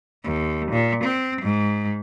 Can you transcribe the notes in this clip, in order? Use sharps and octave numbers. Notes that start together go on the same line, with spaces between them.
D#2
A#2
C4
G#2